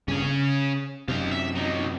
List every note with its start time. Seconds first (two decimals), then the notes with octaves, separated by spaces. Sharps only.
0.08 G2 C#3 C#4 G#4
0.22 C#3
1.08 F#2 C3 D#4 F5
1.31 E5
1.55 F#3 D#4